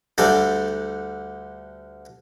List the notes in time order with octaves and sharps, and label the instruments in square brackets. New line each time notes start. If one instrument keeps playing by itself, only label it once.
[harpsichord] D2 D3 G3 D5